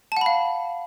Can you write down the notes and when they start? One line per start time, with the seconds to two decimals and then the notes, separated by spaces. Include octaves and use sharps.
0.12 A5
0.17 F#5
0.21 B5
0.26 F5